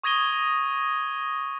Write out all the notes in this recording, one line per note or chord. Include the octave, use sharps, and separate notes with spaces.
C#6 D#6 G#6 A#6 D#7 G7